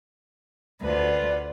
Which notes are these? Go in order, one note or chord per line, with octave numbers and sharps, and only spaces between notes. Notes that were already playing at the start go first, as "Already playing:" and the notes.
D2 F4 B4 D5 F#5